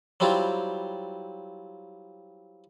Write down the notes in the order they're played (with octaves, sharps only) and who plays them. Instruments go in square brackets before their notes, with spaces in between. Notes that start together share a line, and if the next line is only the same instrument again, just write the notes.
[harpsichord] F#3 G3 C4 E4 F4